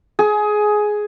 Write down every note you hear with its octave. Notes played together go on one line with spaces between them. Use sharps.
G#4